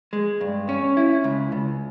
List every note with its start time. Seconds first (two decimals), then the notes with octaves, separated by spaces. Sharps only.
0.13 G#3
0.41 G2
0.69 C#4
0.97 E4
1.24 C#2
1.52 C#2